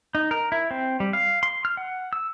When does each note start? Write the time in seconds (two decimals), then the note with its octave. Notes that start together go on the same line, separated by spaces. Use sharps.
0.15 D#4
0.31 A#4
0.52 E4
0.71 C4
1.00 G3
1.13 F5
1.43 C6
1.65 F6
1.77 F#5
2.13 E6